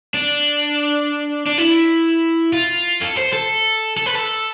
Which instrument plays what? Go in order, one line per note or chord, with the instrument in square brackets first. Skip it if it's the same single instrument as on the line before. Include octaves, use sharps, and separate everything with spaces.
[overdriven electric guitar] D4
D4
E4
F4
A4
C5
A4
A4
B4
A4